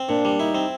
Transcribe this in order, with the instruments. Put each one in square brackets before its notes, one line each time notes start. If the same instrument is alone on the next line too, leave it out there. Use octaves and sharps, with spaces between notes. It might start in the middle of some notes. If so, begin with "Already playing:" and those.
Already playing: [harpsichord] C4
[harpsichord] A#2 [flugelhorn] D4
[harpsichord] G3
[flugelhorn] D#4 [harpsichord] E4
[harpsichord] C4